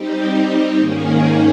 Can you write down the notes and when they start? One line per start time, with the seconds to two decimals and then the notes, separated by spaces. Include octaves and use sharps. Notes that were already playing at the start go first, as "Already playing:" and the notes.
Already playing: G3 C4 D#4 G4
0.77 G#2 D#3 A#3 C#4 G#4